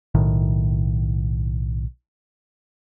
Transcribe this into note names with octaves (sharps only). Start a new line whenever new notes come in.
B1 A2 D#3